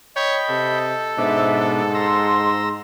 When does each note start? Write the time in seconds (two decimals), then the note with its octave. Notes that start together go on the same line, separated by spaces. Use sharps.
0.16 C#5 D#5 G5 B5
0.49 C3 A4
1.18 G#2 B2 D4 C5 D#5 E5
1.95 A#5 C6 E6